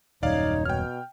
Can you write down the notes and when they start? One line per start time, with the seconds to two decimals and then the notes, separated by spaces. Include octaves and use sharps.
0.23 D#1 F#2 D#4 C#5 D5 F5
0.65 B2 G5 F6